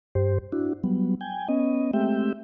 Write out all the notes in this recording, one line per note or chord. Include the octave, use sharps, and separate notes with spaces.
G2 G4 C5
D4 E4 F#4
F#3 G3 B3
G5 G#5
B3 C#4 D#5
G#3 A3 C4 G4 E5 G5